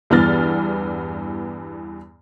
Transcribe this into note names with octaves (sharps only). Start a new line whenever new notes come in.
E2 G2 E3 B3 F6 A6